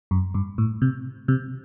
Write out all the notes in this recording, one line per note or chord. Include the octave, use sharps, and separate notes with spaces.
F#2
G2
A2
C3
C3